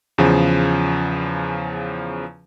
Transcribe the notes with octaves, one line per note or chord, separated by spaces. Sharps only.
E2 C#3 F3